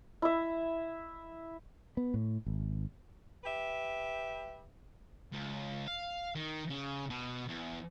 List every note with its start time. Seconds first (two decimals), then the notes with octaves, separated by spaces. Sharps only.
0.22 E4 E5
1.97 B3
2.14 A2
2.46 G#1
3.44 G4 B4 E5
5.32 C#2
5.87 F5
6.35 D#3
6.70 C#3
7.10 B2
7.48 E2